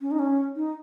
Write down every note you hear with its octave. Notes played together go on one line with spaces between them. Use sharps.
C#4
D#4
C#4
D#4